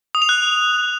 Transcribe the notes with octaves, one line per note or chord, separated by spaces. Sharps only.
D#6
F7
F#6